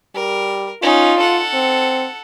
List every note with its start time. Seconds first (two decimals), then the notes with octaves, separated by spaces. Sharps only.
0.15 G3 A#4
0.83 C#4 D#4 F4
1.19 A4 F#5
1.53 C4